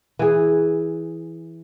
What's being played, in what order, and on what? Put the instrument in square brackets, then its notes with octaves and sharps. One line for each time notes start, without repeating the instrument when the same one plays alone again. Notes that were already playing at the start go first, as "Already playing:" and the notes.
[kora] E3 G#4